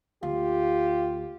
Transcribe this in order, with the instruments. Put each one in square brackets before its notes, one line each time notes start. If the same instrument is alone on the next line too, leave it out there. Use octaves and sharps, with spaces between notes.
[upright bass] D2 [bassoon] F4 [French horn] G4